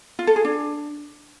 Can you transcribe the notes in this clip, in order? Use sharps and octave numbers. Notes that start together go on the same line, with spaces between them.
F4
A4
G#4
D4